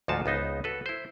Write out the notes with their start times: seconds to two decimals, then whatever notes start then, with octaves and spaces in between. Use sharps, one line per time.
0.08 D2 G#2 F3 F4 F#4 A5
0.26 C#2 B3 D#4 C5
0.64 F#4 A4 B4
0.86 E4 C5